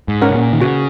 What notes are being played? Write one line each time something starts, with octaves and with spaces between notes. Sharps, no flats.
G#2
C#4 A#4 F#5
C#3
A#2
D#3
C#3 F#4